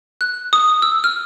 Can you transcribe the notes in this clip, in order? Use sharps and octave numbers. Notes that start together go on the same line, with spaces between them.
F#6
D#6
E6
F6